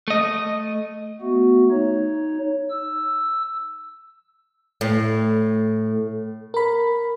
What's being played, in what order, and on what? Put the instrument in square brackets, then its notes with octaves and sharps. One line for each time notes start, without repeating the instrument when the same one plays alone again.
[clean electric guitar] A3 D#5
[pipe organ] A3 B3 F#4
D#4 C#5
E6
[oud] A2
[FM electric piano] A#4 B5